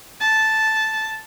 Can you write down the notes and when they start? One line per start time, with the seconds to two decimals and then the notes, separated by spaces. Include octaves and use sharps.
0.21 A5